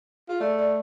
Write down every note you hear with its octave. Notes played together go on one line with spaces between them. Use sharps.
F4 G#4
A3 D5
D5